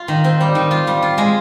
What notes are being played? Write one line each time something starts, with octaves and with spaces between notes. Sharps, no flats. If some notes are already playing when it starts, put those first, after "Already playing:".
Already playing: F4
D#3
C4
G3
D#3
F4
G3
F4
G#3